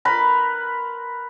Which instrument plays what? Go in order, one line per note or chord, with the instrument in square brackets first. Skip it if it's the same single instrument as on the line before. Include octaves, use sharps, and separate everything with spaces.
[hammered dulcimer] A#4 B4 B5 C6